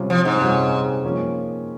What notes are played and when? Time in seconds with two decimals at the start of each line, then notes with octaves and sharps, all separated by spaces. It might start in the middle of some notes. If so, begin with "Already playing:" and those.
Already playing: C3 G3 C#4 F4
0.10 F3
0.25 G#2
0.41 C3 G3 C#4 F4
1.04 F3 A#3 C#4